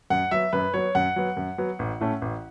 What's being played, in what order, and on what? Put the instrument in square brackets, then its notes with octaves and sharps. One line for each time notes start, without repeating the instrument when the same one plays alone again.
[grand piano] F#2 F#5
F#3 B3 E5
F#2 B4
F#3 B3 C#5
F#2 F#5
F#3 B3
F#2
F#3 B3
A1
A2 A3 C#4
A1